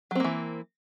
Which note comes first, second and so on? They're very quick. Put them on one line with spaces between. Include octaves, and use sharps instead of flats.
F#3 C4 A#3 E3